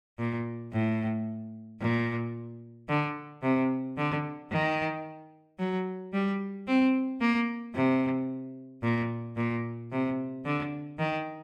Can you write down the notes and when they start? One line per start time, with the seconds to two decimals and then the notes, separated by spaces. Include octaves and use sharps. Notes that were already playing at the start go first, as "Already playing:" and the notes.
0.19 A#2
0.73 A2
1.81 A#2
2.89 D3
3.42 C3
3.97 D3
4.51 D#3
5.59 F#3
6.13 G3
6.67 C4
7.20 A#3
7.75 C3
8.83 A#2
9.36 A#2
9.91 C3
10.45 D3
10.99 D#3